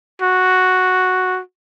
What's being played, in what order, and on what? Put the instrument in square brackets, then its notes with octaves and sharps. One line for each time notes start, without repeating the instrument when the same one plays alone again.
[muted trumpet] F#4